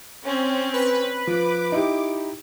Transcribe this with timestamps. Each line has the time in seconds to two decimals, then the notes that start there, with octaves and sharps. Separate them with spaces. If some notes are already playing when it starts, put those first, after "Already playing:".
0.24 C4 C#4
0.73 B4
1.27 F3 D6
1.72 D#4 E4 G4